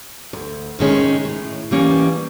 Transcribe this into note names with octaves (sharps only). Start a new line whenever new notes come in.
D2
C3 D#3 G#3 C#4
A2
E3 G3 A#3 C#4